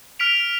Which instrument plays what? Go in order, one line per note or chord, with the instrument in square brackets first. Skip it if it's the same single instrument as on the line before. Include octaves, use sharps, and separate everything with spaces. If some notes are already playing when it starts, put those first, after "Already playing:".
[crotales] F6 B6 D7 F7